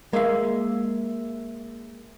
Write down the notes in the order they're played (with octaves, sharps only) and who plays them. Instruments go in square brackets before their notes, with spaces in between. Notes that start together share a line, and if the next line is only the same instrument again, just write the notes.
[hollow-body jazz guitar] G#3 F5 [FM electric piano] A#3 E5